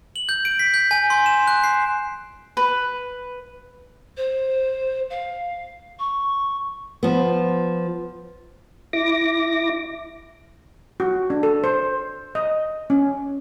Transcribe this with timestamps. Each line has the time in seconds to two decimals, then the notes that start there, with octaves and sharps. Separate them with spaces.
0.16 F#7
0.29 G6
0.45 D7
0.59 B6
0.74 G6
0.91 G#5
1.10 C6
1.26 E7
1.47 F#6
1.64 C7
2.57 B4
4.17 C5
5.10 F5
5.99 C#6
7.03 F3 B3
8.93 E4 D6 A#6
11.00 F#4
11.30 D4
11.43 A4
11.64 C5
12.35 D#5
12.90 C#4